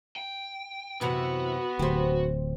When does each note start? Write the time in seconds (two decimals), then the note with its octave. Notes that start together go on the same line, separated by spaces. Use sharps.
0.16 G5
1.01 F#2 C3 E3 B3 F#4
1.79 D1 G4 C5